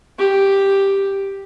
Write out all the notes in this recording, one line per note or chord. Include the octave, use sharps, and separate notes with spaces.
G4